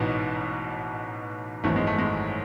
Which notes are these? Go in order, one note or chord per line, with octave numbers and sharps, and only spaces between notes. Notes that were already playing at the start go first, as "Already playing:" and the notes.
Already playing: A1 G#2 B2 E3 B3
G#1 F#2 E3 A3
G#3
A3
G#3